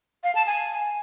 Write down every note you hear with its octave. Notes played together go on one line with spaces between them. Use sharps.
F5
A5
G#5